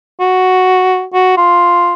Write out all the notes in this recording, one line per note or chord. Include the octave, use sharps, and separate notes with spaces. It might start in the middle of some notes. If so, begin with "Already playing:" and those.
F#4
F#4
F4